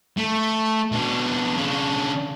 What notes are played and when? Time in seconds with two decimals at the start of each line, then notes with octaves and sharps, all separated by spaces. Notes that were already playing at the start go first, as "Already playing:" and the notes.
0.17 A3
0.92 B2 D4
1.57 C#3 D4